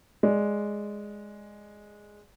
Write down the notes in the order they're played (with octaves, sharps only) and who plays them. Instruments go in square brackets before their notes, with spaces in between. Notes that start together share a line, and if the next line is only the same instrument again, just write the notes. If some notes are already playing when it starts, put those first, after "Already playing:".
[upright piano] G#3 D5